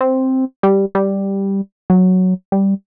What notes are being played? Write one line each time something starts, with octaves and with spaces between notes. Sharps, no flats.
C4
G3
G3
F#3
G3